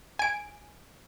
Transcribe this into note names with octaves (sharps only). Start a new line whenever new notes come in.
G#5 D7